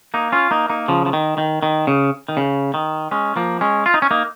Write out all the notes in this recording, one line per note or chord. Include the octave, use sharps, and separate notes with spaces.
A#3 D#4
C#4 F4
A#3 D#4
A#3 D#4
C#3 F3
F3
D#3
D#3
D#3
C#3
D#3
C#3
D#3
G#3 C#4
F3 A#3
G#3 C#4
F4
D#4
C#4
A#3 D#4